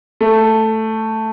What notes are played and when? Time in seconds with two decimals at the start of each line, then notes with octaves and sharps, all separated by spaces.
0.21 A3